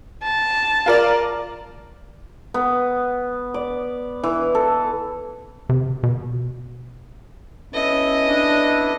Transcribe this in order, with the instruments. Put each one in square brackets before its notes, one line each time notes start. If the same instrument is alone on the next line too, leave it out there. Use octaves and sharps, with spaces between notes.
[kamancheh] A5
[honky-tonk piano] F4 A#4 D5
[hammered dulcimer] B3
D5
E3
A4
[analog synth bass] C3
B2
[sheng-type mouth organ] B3 E4 A4 [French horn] C#4 [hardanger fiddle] D#5
[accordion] D4